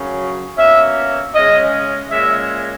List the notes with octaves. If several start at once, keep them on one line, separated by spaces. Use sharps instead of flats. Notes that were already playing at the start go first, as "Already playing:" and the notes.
Already playing: F#2 C#3 F#3 C#4
B2 A#3 C#4 E5
C#3 G#3 C#4 D#5
A#2 G#3 C#4 E5